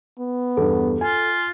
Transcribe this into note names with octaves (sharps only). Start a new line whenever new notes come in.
B3
E2 G2 A4
F4 G#5